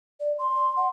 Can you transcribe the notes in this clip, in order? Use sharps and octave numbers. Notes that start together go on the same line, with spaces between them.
D5
C6
F#5